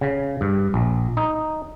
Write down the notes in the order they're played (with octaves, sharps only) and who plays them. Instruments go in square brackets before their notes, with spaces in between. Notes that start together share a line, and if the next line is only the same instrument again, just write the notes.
[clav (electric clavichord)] C#3
G2
A#1
D#4